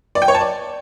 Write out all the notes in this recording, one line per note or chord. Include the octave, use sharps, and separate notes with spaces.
D5
G5
C#5
A5
D5